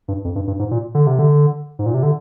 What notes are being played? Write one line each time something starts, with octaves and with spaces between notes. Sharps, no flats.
G2
F2
G2
G2
G#2
A#2
D3
C3
D3
G#2
A#2
C3
D3